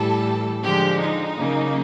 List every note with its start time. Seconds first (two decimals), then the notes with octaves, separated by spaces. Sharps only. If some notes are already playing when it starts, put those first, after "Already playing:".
Already playing: A2 E3 G3 A4
0.63 D3 F3 G#3 G4
1.00 D#4
1.37 C#3 F#3 A#3